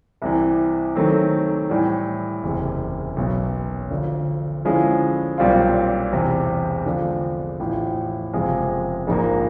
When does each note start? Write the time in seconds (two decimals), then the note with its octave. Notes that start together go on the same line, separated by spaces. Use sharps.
0.22 C2 C3 E3
0.96 D#3 F#3 A3 C4
1.70 A2 E3 G3
2.43 F#1 E2 C3
3.16 B1 B2 F#3 B3
3.90 D2 D3 F3
4.65 D3 F3 G#3 C#4 E4
5.38 B1 A#2 G3 C4 F4
6.12 E1 E2 C3
6.86 D3 F3 G#3 C4
7.60 A1 A2 F3
8.33 F#1 F2 C3 F3 G#3
9.07 A#1 G#2 F3 A#3